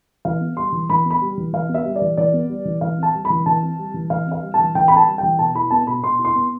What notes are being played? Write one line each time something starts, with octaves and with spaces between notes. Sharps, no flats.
E3 F5
B3
G3 C6
E3
E3 B5
B3
B5
G3
E3
E3 F5
B3
E5
G3
D5
E3
E3 D5
B3
G3
E3
E3 F5
C4 A5
G3
B5
E3
E3 A5
C4
G3
E3
E3 F5
C4
F5
G3
A5
E3
E3 G5
C4 B5
A5
G3
E3 G5
B2 A5
E4 B5
B3 A5
B2 B5
B2 C6
E4
C6
B3